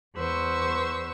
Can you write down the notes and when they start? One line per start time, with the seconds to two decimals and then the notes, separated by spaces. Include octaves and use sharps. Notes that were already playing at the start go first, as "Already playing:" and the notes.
0.16 E2 B4 C5 C#6 E6